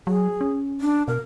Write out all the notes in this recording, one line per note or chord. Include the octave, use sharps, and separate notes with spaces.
F#3 G#4
C#4
D4
B2 A#4